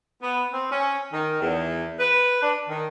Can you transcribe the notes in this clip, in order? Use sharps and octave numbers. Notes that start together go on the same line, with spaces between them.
B3
C4
C#4
D#3
E2
B4
D4
D#3